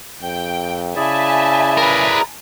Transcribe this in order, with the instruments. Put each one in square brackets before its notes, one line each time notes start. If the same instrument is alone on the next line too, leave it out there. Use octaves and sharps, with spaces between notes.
[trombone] F2 [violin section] G5
[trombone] C#3 [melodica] E4 G#4 D5 [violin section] E5 G#5 A5
[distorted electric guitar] A#4 B4